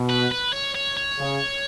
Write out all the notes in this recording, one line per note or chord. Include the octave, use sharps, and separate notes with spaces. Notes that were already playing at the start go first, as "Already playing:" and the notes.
Already playing: B2
B4
B4
C#5
C#5
C#5
C#3